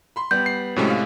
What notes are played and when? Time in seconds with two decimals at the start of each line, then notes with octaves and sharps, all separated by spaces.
0.16 B5 C6
0.31 G3 B3 G4 G6
0.46 C7
0.76 A2 C3 F#3 G#3 C#4
0.90 F5